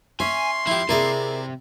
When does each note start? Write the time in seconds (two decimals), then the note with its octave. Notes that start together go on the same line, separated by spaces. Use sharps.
0.20 C#4 E5 G#5 C6
0.67 F2 F3 E4 G4
0.89 C3 E4 G#4 A#4 D5 A#5